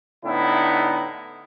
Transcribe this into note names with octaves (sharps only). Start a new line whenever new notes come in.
A2 D3 B3 D#4 E4